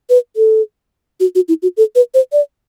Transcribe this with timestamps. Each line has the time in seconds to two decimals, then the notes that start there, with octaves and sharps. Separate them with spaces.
0.10 B4
0.36 A4
1.20 F#4
1.35 F#4
1.48 E4
1.62 F#4
1.77 A4
1.95 B4
2.14 C5
2.32 D5